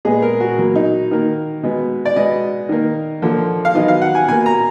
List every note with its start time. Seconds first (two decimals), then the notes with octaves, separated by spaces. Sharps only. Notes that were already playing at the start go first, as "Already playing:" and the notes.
0.05 A#2 G#3 B3 G#4
0.22 A#4
0.40 F#4
0.58 B2 F#3 A#3
0.76 D#4
1.11 D#3 A#3
1.63 B2 G#3 B3
2.05 D5
2.16 B2 G#3 B3 D#5
2.69 D#3 A#3
3.22 D3 F3 A#3
3.65 F5
3.75 D#3 F#3 B3 D#5
3.88 F5
4.01 F#5
4.15 G#5
4.28 B2 A#3 G#5
4.46 A#5